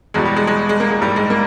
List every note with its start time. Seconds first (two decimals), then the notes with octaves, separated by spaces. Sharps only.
0.14 E1 E2 B2 G3 G#3
0.25 G3
0.37 G#3
0.47 G#3
0.69 G#3
0.80 A#3
0.91 G#3
1.01 A#1 G#2 G3
1.16 G#3
1.30 A#3